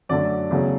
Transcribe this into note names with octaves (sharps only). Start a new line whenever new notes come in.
F#2 D3 F#3 A3 D5
E2 C#3 F#3 A3